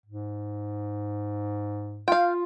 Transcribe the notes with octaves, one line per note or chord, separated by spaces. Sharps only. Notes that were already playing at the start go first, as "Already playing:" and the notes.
G#2
F4 F5 G5